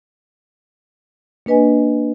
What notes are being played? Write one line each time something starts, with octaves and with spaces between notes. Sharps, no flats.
A#3 D4 B4 D#5 G#5